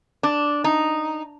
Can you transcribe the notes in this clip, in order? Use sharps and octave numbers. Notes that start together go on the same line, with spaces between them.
D4
D#4